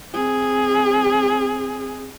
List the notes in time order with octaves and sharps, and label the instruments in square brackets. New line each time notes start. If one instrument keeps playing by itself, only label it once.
[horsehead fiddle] C4 G#4